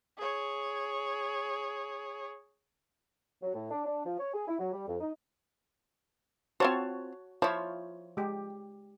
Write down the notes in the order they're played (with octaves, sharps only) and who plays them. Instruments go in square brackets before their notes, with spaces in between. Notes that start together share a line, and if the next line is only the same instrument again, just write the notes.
[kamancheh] G#4 C#5
[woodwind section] F#3
A2
D4
D4
F3
C#5
G#4
E4
F#3
G3
F2
D#4
[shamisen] C4 F4 C5 [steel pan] F#4 C#5 A5
[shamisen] F3 E4 [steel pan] F4 C5 C#5
[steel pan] G#3 G4